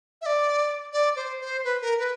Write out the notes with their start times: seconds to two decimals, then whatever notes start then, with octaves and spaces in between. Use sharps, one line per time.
0.22 E5
0.26 D5
0.93 D5
1.16 C5
1.41 C5
1.64 B4
1.82 A#4
1.99 B4